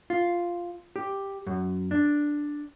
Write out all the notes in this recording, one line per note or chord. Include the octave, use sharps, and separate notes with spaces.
F4
G4
F#2
D4